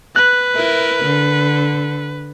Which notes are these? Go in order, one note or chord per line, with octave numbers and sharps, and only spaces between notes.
B4 F#6
E4 A#4
D3